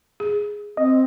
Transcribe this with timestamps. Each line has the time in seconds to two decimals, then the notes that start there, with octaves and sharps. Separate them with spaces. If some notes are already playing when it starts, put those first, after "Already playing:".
0.20 G#4
0.77 C4 D#5